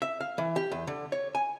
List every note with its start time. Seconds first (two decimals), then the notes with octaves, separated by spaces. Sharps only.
0.02 E5
0.20 F5
0.38 E3
0.56 G4
0.72 E2
0.87 D3
1.12 C#5
1.35 G#5